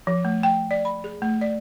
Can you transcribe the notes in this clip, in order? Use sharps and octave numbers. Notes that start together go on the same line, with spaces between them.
F3
A3
G5
D5
B5
G#4
A3
D5